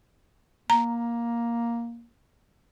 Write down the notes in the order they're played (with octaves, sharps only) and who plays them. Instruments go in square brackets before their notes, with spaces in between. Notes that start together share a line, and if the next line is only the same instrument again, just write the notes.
[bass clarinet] A#3 [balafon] A#5